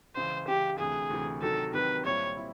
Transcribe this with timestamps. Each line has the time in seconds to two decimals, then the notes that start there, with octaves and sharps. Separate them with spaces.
0.15 C#2 C#3 E3 C5
0.48 C#2 C#3 E3 G4
0.79 D2 C3 E3 G#4
1.10 D2 C3 E3
1.42 C3 D#3 F#3 A4
1.74 C3 D#3 F#3 B4
2.05 C2 A#2 G3 C4 E4 C#5
2.37 C4 E4